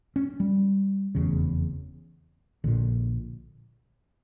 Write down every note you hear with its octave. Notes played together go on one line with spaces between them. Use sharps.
C#4
G3
F1 E2 C#3
A#1 A#2 D3